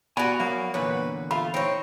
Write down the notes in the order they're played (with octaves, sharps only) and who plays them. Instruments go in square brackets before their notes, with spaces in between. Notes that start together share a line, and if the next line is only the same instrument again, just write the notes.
[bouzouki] B3 F#4 [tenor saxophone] D5 [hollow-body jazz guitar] G#5 [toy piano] B5
[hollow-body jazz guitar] F#3 F5 [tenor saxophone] A#3
[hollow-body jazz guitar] E2 A#2 D3 [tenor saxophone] B4 [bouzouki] C#5
[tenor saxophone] A3 [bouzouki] F4 [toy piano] B5
[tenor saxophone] C4 [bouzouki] D#4 C#5